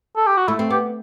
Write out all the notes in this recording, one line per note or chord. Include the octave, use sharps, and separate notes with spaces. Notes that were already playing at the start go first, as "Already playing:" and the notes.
A4
G4
F#4
A3 E4
C4
B3 G4